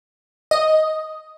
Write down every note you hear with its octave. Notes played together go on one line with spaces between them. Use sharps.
D#5